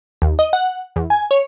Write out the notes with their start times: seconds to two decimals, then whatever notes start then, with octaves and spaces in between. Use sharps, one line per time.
0.22 D#2
0.39 D#5
0.53 F#5
0.96 E2
1.10 G#5
1.31 C#5